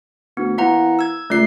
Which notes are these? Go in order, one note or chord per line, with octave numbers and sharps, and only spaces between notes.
D2 B3
E3 A#3 F#5 A#5
E6 G#6
C#2 A3 D5 C7